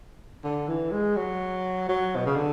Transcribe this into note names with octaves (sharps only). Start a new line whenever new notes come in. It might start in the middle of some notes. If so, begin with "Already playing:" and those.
D3
E3
G#3
F#3
F#3
B2
C#3
D3